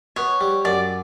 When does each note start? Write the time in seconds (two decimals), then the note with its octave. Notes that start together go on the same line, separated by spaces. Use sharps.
0.16 B3 C#5
0.41 G3
0.65 F#2 D5